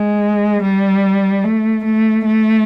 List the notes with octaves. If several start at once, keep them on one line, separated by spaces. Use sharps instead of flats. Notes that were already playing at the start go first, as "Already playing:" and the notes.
Already playing: G#3
G3
A3
A3
A3